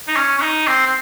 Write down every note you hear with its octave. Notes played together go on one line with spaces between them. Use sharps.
D#4
C#4
C#4
D#4
C4
C4